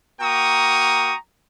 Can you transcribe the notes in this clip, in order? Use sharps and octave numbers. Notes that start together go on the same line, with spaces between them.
A#3 F#4 G5 A#5 C#6 D#6